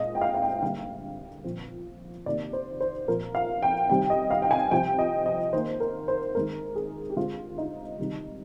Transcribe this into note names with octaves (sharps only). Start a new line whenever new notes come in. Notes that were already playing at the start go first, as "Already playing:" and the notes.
Already playing: A#2 G#3 C4 D#5
G5
F5
F5
G5
D3 G3 A#3 F5
A#2 F3 C4
C3 D#3 A#3 D5
C5
C5
A#2 F3 C4 A#4
F5
G5
C3 D#3 G3 C4 G5
D#5
F5
G5
G#5
C3 F3 C4 G5
D#5
D#5
D#3 A#3 C5
A#4
C5
D#3 G#3 C4 A#4
G#4
G4
D3 G#3 C4 F4
D#4
C3 D#3 G3